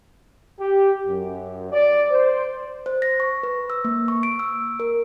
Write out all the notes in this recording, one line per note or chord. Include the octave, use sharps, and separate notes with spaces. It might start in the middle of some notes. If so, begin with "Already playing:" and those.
G4
F#2
D5
C5
C5
A#6
C#6
B4
E6
A#3
C#6
D7
E6
A#4